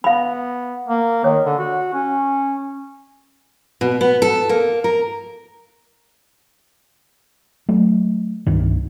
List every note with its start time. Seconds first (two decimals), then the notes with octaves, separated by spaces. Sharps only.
0.04 B3 F5 B5
0.88 A#3
1.24 D#3 C#5
1.45 D3
1.59 F#4
1.94 C#4
3.81 B2
4.01 B3
4.22 A4
4.49 A#3
4.84 A#4
7.69 F#3 A3
8.47 C2 G2 D#3